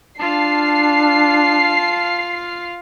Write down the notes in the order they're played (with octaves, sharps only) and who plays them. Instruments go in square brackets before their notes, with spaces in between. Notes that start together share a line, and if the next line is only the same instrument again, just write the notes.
[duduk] D4 [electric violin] F4 F5 [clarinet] A5 [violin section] C7